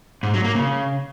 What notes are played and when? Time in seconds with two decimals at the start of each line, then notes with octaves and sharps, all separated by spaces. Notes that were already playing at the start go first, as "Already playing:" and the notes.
0.23 G#2
0.34 F#3
0.44 A#3
0.55 C#3